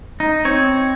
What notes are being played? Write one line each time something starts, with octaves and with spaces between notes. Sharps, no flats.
D#4
C4 C#5